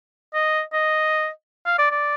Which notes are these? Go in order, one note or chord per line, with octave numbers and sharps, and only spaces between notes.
D#5
D#5
F5
D5
D5